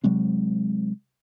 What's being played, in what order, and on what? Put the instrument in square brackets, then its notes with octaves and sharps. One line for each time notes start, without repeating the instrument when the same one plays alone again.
[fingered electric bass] C3 F#3 G#3 C4